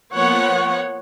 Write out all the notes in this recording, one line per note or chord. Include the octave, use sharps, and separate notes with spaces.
F3 A#3 B3 C#5 F#5